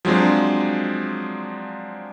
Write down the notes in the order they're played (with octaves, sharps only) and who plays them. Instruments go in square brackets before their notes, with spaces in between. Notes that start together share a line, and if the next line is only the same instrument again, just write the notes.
[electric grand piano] F3 F#3 G#3 C4 D4